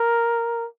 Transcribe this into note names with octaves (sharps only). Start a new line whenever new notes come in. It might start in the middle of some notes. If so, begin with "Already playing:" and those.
Already playing: A#4